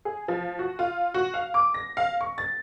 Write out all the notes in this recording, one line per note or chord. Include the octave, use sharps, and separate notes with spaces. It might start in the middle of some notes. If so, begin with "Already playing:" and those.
G#4
F3
F#4
F4
F#4
F5
D6
A#6
F5
C#6
A6